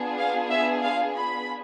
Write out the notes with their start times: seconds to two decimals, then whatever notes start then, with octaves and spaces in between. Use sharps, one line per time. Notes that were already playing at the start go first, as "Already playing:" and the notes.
Already playing: B3 D4 F4 G#4
0.18 F5
0.51 E5
0.84 F5
1.17 B5